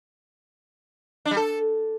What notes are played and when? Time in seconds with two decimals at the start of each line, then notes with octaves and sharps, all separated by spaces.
1.25 D4
1.31 G3
1.37 A4